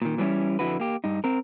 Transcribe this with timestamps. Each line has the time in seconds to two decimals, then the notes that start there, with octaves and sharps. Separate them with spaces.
0.02 A#2 D#3
0.18 E3 F#3 G3 C4 C#4 E4
0.59 F2 D3 E4 F#4 B4
0.80 A#3 G4
1.04 G2 D#4
1.24 C4 A#4